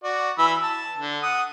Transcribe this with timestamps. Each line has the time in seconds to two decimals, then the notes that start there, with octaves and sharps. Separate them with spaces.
0.04 F#4 D5
0.38 E3 B5 E6
0.63 A5
0.97 D3
1.23 F#5 D#6